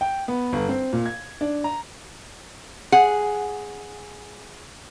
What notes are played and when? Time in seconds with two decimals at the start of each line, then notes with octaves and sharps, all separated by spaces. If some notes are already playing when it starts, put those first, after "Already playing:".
0.01 G5
0.28 B3
0.53 G1
0.69 C4
0.93 A#2
1.06 G#6
1.41 D4
1.64 A#5
2.92 G#4 F#5